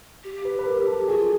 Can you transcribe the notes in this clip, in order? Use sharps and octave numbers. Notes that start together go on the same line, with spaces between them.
G4
B4
B4
A#4
A4
F#4 G#4
F4